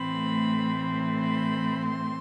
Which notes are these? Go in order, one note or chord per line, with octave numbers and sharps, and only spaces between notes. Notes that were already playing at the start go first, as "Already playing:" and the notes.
Already playing: A2 E3 A3 C4 B5
B5
C6